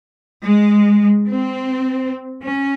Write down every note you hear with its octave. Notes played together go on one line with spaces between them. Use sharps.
G#3
C4
C#4